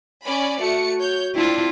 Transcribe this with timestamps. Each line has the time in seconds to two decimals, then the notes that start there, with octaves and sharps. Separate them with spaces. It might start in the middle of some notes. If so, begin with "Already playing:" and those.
0.24 C#4 D5 B5
0.60 A3 F#4 C#7
0.99 C#5 G6
1.35 C4 D4 E4 F4